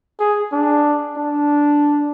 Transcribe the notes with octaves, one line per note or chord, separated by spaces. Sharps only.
G#4
D4
D4